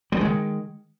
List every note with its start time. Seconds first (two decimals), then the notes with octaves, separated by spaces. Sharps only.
0.12 G3
0.17 E3
0.21 G#3
0.25 D#3